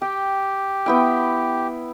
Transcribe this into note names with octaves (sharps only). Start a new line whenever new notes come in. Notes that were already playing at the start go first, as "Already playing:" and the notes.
G4 G5
B3 E4 G5